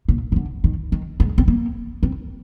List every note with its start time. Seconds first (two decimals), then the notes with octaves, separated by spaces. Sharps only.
0.09 A#2
0.32 C3
0.36 D3
0.64 D#3
0.92 D#3
1.20 G#3
1.38 C4
1.48 A#3
2.03 C4